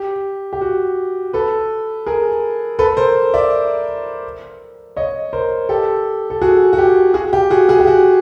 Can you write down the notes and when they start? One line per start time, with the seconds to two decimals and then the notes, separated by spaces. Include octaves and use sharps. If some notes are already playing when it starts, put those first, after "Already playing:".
Already playing: G4
0.53 G4
0.61 F#4
1.33 A4 B4
2.06 G#4 A#4
2.79 A4 B4
2.97 A#4 C5
3.34 D5 E5
4.96 C#5 D#5
5.33 A#4 C5
5.69 G4 A4
6.30 A4
6.42 F#4 G#4
6.73 F#4
6.78 G4
7.14 F#4 G#4
7.33 G4
7.50 F#4 G#4
7.69 F#4 G#4
7.80 G4
7.87 F#4